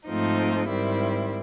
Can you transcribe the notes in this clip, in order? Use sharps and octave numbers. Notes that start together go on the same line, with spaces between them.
G#2 F3 A3 C4 D#4
G#2 D#3 G3 C4 E4